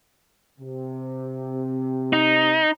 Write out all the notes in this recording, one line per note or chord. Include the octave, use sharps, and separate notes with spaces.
C3
D#4